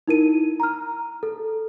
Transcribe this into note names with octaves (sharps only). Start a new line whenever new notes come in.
D#4 E4 A#4 D#7
A#5 F6
A4